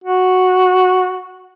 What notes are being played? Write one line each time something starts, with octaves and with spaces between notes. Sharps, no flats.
F#4